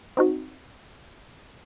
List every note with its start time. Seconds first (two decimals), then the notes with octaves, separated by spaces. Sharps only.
0.17 C4 D#4 F#4